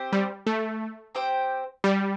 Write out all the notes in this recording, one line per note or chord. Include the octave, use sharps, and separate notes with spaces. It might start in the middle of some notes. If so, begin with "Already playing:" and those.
Already playing: C4 G4 C5
G3
A3
C4 G4 C5 G5
G3